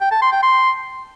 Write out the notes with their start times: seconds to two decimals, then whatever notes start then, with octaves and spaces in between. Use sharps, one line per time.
0.01 G5
0.11 A5
0.22 C6
0.32 G5
0.43 C6